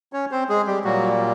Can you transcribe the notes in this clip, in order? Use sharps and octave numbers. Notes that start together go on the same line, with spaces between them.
C#4 C#5
C4 C5
G#3 G#4
G3 G4
A#2 F#3 G3 A#3 F#4